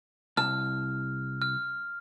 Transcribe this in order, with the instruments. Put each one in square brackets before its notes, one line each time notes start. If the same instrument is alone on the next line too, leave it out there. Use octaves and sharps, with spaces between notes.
[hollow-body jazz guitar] C2 A5 [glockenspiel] F6
[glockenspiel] F6